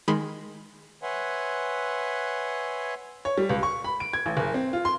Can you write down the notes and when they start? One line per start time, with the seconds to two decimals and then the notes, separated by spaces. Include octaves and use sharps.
0.08 D#3 G#3 B5 C6
1.03 B4 C#5 E5 F#5 G#5 C6
3.25 C#5
3.38 G3
3.49 C#2
3.63 C#6
3.84 B5
4.00 D7
4.13 G#6
4.26 A1
4.37 F#1
4.54 C4
4.73 F4
4.85 C6